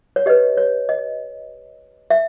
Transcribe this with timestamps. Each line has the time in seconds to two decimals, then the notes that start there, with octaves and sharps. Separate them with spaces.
0.16 C#5
0.26 G4 B4 D#5
0.57 C#5
0.89 D#5
2.10 E5